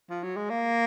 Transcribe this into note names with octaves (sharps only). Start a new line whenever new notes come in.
F3
F#3
G#3
A#3